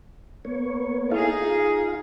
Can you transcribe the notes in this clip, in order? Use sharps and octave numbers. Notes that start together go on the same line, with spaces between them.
A#3 B3 C#5
D#4 E4 G#4 A4 F5
F4